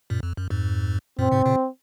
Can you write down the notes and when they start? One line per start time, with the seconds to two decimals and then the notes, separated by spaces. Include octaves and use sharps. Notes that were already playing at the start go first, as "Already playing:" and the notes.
0.10 F#2 A#2
0.23 F2
0.37 F#2
0.50 F2 G#2
1.19 F#2 A#2 C4
1.32 G#2 C3
1.46 A#2 C#3